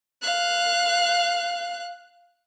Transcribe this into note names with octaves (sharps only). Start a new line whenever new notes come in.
F5 F#6